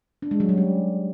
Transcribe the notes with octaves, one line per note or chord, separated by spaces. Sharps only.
D4
G#3
F#3
G3
C#4